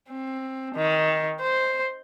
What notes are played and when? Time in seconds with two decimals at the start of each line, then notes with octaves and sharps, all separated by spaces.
0.10 C4
0.74 D#3
1.40 C5